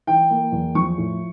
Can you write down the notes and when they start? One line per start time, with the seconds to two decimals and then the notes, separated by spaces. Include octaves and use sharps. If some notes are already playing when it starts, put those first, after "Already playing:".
0.07 E3 G5
0.30 A#3
0.52 E2
0.75 F3 C#6
0.98 A2